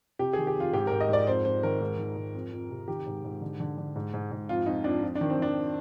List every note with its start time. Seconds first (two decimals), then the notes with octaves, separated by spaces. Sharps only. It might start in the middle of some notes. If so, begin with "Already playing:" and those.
0.19 C3 G4
0.33 D#3 G#4
0.47 G4
0.55 F2
0.60 F4
0.73 G#2 G4
0.87 G#2 A#4
1.01 D#5
1.09 G#2 D5
1.27 F2 C5
1.44 F2 C5
1.63 D#3 A#4
1.81 G#2
1.98 D#3
2.17 G#2
2.35 F2
2.53 F2
2.70 C3
2.88 D#3 G4
3.06 G#2
3.24 G#2
3.41 D3
3.60 D3
3.78 D3
3.96 G#2
4.14 G#2
4.31 G#2
4.49 F2 F4
4.66 F2 D#4
4.84 F2 D4
5.02 F2
5.15 D4
5.21 D#3
5.30 C4
5.38 D#3 D4